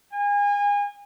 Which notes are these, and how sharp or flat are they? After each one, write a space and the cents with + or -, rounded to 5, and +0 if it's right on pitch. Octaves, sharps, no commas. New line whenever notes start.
G#5 -30